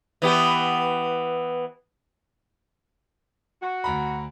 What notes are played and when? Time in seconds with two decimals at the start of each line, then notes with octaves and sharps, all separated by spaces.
0.22 E3 B3 G4
3.61 F#4
3.84 D2 A#5 B5